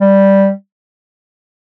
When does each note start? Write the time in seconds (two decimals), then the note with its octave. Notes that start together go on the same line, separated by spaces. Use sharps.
0.01 G3